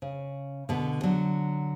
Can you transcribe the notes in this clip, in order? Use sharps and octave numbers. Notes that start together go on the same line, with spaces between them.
C#3
B2 D3
D3 F#3